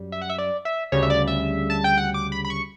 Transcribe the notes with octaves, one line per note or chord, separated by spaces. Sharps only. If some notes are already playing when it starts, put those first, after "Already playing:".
Already playing: F#2 G3
E5
F#5
E5
D5
E5
D2 C#3 G3 C#5
E5
D5
E5
A5
G5
F#5
D6
B5
B5
C#6